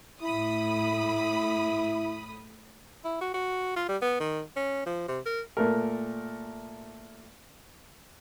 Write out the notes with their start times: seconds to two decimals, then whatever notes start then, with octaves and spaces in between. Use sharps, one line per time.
0.23 A2 E4 B5 D#6
3.04 E4
3.21 F#4
3.34 F#4
3.76 F4
3.88 G3
4.02 B3
4.20 D#3
4.56 C#4
4.86 F3
5.08 C3
5.26 A#4
5.57 A#2 A3 A#4